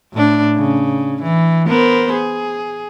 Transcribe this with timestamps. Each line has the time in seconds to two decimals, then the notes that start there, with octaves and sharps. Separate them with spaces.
0.13 A2 D4
0.56 C#3
1.22 E3
1.68 B3 A#4 C5
2.13 G#4